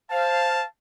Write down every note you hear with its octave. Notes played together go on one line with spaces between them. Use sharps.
C5 F5 A5